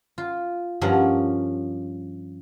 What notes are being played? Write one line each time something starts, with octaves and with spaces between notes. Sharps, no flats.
F4
G2 F3 C#4 A#4 F#5 A#5